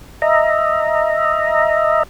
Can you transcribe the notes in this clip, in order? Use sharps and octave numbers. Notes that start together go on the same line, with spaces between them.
D#5 E5 A#5